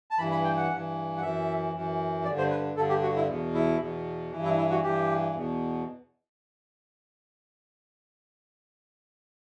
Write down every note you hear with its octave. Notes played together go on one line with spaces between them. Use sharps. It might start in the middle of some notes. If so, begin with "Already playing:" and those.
A5
G2 E3 B5
B5
G5
F#5
G2 E3
F#5
F#2 E3 E5
F#2 E3
G2 D3 D5
C5
B4
G2 D3 A4
G4
F#4
E4
E2 B2
E4
E2 B2
G2 E3
E4
E4
F#4
G2 E3 G4
E2 B2